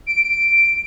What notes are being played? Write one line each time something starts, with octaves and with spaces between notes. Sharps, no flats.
D7